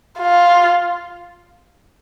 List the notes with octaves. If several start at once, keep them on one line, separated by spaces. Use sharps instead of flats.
F4